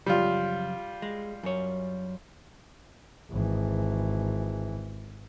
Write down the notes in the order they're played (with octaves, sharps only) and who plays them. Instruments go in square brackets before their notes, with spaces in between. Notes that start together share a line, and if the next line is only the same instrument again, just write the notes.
[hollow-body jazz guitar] F#2 C#3 F3 [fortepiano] G3 F4
[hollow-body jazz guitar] G#3
F#2 C#5
[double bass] G#1 E3